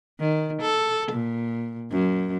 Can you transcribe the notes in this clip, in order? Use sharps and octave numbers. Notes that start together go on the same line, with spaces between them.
D#3
A4
A#2
F#2